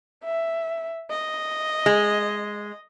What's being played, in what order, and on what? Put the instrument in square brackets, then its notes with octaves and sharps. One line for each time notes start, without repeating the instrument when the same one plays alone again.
[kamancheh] E5
D#5
[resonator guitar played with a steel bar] G#3